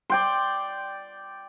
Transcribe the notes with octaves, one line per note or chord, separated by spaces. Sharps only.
D5 G5 C6